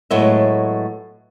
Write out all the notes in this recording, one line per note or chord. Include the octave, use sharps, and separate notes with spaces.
A2 F#3 G#3 B3 D#5 E5